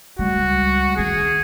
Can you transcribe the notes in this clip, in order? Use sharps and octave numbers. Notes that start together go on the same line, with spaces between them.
C#2 G3 F#4
D#3 C#4 G#4